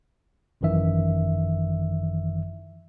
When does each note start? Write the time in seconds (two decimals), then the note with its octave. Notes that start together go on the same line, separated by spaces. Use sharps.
0.61 G#1 F#2 D#3 E3 E5